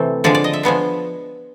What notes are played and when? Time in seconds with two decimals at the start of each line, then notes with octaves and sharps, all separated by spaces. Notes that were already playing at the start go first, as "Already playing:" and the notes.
Already playing: C3 E3 A3 C4
0.24 D3 F3 G#3 D5
0.35 D5
0.44 D#5
0.53 E5
0.63 F3 G#3 B3 D4